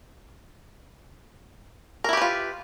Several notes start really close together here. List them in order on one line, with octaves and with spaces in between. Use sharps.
A#4 E4 G4 B4 F4